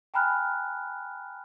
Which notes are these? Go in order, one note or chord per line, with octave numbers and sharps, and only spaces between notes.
G5 G#5 A#5 B5 F6 F#6